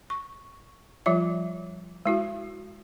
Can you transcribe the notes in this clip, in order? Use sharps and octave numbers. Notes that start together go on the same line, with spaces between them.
C#6
F3 G3 F4 E5
G#3 E4 F#4